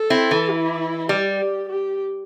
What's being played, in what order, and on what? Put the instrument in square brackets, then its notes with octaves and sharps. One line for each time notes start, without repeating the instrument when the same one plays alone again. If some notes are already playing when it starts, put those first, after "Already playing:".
Already playing: [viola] A4
[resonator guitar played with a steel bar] C4 E4
E3
[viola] E4
[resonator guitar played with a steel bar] G3 [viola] G4
[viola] G4